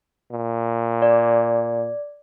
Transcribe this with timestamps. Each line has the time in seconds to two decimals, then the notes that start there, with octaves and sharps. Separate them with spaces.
0.31 A#2
1.02 D5